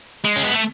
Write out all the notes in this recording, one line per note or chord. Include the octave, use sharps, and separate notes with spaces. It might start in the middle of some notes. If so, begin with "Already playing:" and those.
G#3
C#4
B3
A3